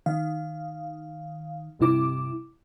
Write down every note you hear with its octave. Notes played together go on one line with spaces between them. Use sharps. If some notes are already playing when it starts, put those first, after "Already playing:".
D#3 F5
G1 G2 C3 E4 D6